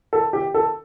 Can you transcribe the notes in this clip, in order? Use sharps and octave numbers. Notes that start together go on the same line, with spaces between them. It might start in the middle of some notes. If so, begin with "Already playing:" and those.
A4
G4
A4